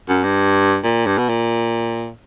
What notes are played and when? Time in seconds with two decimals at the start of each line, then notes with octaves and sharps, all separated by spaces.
0.08 F#2
0.23 G2
0.84 A#2
1.06 G2
1.18 B2
1.29 A#2